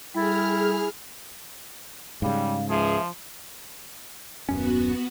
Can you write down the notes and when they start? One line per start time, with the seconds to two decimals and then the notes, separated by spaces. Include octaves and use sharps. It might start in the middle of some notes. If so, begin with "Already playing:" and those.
0.14 G3 E4 G#4 A4 F6
2.22 G#2 C#3 G3 F5
2.69 C#2 F3 G#4 E5
4.49 D#1 F#2 B3 C#4 F#4